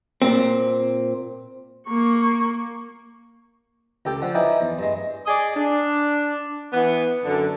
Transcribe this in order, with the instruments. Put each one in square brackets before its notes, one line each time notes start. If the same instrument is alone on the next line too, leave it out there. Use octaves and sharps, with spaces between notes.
[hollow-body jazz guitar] A#2 C4
[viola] A#3 C#6
[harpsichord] C#2 G4 A4 G5
D3 F3 F#5
D#4 E4 B4 D5 G5 G#5
E2
G2 G#3
[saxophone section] G#4 D5 D#5
D4
E3 B3
F#2 D3